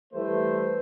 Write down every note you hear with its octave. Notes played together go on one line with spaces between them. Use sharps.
E3 G3 A3 B4 C5